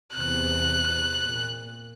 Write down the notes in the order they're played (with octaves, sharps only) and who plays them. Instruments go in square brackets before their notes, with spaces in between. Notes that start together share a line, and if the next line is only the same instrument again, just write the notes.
[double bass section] E2 C3 [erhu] F#6
[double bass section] A#2